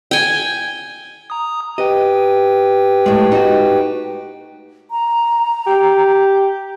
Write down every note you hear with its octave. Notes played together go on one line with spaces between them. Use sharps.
G5 G#5
A#5 D#6
G4 B4 D#5 G5
A2 G#3
D#4 F#4
A#5
G4